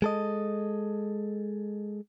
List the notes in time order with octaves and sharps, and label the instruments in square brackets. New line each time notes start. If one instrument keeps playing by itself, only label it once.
[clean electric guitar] G#3 A4 D#5